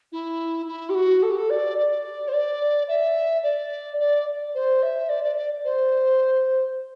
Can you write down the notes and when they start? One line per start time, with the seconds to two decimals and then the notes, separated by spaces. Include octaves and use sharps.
0.12 E4
0.67 E4
0.89 G4
0.94 F#4
1.22 A4
1.30 G4
1.37 A4
1.50 D5
1.78 D5
2.28 C5
2.33 D5
2.88 E5
3.43 D5
3.99 D5
4.54 C5
4.82 E5
5.09 D5
5.24 D5
5.37 D5
5.65 C5